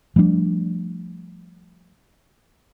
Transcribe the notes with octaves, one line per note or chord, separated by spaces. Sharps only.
F3 G3 A3 D4